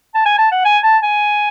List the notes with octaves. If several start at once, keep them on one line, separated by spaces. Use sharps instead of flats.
A5
G#5
A5
F#5
G#5
A5
G#5